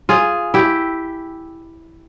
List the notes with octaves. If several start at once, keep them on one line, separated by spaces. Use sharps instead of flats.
F4 G#4
E4 G4